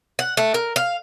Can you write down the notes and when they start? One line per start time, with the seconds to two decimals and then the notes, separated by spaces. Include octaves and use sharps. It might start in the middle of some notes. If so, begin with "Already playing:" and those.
0.19 F#5
0.37 A3
0.54 A#4
0.76 F5